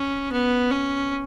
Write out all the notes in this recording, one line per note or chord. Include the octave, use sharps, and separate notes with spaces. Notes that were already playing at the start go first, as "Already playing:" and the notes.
Already playing: C#4
B3
C#4